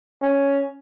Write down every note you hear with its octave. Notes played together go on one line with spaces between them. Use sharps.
C#4